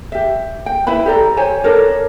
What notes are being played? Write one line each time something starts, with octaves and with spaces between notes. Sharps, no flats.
G4 E5
G5
E4 B4 E5 B5
G4 A4 D5 A#5
G4 C5 C#5 G#5
D4 A4 A#4 C#5